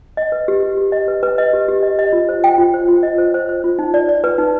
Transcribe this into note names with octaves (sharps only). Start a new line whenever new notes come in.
D#5
B4
G4
G4
G4
D#5
B4
B4
D#5
G4
G4
D#5
D#5
F4
C5
G5
F4
C5
F4
D#5
C5
C5
C5
F4
D#4
D5
D5
B4
D#4